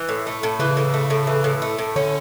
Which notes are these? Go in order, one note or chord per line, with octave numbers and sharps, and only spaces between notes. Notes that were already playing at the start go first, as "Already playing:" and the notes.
Already playing: E3
A2
A3
A2
C#3 E3
A2
A3
A2
E3
A2
A3
A2
D3 C#4